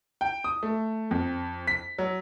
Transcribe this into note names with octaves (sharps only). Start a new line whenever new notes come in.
G5
D#6
A3
F2
B6
F#3